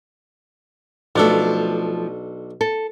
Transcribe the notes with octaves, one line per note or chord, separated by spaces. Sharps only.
B1 F3 A3 D4 A4
A4